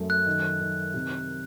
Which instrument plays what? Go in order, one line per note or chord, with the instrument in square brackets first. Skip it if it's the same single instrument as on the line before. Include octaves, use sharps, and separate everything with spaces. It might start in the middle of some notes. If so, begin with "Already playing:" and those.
Already playing: [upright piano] F#2 A3
[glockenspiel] F#6
[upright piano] D#3
D#3
C3